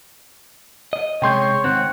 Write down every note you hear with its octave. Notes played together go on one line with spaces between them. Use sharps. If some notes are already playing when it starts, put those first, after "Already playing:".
D#5
C3 G#3 C#4 C#5 G5 C6 G6
G#2 D#3 C4 F#5